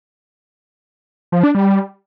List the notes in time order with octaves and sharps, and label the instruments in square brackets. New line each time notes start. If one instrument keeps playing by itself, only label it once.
[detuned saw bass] F3
D4
G3